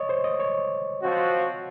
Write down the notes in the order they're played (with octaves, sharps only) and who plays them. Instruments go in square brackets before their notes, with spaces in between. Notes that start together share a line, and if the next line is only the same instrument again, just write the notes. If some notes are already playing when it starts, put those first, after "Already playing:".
Already playing: [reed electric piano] C#5 D#5
C5
D#5
C#5
[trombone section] F3 C4 F#4